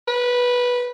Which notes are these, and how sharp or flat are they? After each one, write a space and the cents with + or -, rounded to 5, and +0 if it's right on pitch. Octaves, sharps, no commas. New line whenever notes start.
B4 -10